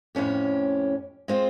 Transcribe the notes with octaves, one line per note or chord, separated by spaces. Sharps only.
F2 A2 C#4 G4
G#3 C4 F4 C5